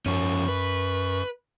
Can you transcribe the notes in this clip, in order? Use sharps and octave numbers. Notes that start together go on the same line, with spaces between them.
F#2 F3 C#4 C#6
B4